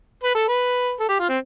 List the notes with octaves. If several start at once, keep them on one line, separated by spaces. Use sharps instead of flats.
B4
A4
B4
A4
G4
F4
C4